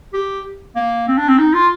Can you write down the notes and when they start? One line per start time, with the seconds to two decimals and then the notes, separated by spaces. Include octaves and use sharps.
0.13 G4
0.75 A#3
1.08 C4
1.17 D4
1.28 C4
1.38 D#4
1.53 F4